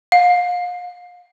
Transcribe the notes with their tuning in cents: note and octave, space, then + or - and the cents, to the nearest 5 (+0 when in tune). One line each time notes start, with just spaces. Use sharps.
F5 +35